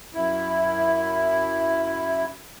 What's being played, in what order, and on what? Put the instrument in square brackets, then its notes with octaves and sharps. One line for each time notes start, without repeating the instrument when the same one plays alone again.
[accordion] F#2 E4